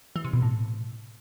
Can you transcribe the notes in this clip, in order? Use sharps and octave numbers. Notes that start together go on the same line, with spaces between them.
E3
C3
B2
A2